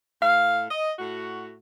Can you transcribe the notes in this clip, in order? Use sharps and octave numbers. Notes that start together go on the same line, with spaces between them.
A2 F5
D#5
A2 F#4